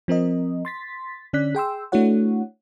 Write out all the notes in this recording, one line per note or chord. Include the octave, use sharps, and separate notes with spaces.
F3 C4 A#4 D#5
C6 A6 B6
D3 C#4 D5 F#6 B6
G#4 G5 C6 E6
A3 D4 E4 F#4 C#5 F#5